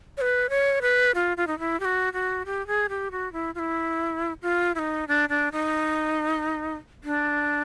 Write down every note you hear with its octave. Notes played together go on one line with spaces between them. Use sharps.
C#5
B4
C#5
B4
F4
F4
D#4
E4
G4
F#4
F#4
G4
G#4
G4
F#4
E4
F4
E4
F4
E4
D#4
D4
D4
D#4
D4